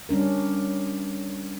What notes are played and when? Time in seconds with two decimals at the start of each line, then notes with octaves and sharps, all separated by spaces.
0.09 G3 C#4 D4 A#4